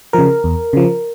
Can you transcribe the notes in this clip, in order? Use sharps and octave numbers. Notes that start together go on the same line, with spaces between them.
C#3 F3 A#4
E2
C#3 F3